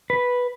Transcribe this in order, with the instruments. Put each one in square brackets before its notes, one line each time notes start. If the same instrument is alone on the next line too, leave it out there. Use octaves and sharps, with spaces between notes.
[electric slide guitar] B4